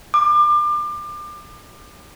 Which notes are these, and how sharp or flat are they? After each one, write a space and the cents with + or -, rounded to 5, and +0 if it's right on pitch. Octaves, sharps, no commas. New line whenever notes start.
D6 +30